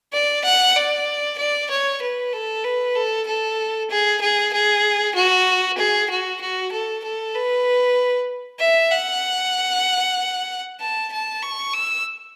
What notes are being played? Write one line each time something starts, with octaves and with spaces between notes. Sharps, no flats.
D5
F#5
D5
D5
C#5
B4
A4
B4
A4
A4
G#4
G#4
G#4
F#4
G#4
F#4
F#4
A4
A4
B4
E5
F#5
A5
A5
C#6
E6